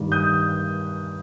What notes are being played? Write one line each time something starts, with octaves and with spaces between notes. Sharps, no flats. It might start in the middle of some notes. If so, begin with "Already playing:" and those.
Already playing: G2 D#3 G3
D#6 G6